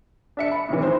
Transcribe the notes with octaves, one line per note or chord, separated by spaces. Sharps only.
D4 E5 C#7
B5
A2 C3 D#3 E3
C5